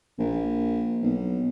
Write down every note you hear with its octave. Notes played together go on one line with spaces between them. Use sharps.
A#1
B1